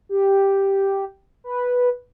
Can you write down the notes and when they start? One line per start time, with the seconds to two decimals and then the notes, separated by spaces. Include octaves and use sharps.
0.09 G4
1.44 B4